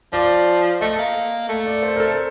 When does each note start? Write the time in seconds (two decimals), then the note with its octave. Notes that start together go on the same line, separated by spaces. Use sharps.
0.13 F3 D5
0.81 A3 D#5
0.98 A#3
1.49 A3
1.66 D5
1.83 C5
1.96 A#4
2.00 A4